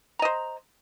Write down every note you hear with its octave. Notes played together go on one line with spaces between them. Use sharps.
C5 D#5 A#5